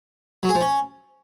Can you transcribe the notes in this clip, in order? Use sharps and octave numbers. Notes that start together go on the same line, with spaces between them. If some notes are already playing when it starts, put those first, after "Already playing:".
F#3
G#4
F3
C#4